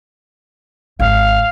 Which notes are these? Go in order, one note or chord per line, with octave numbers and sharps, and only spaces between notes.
G#1 F5